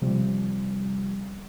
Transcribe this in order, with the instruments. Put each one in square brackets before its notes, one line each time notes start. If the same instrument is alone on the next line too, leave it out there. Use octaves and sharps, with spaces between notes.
[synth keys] C3 F3 G3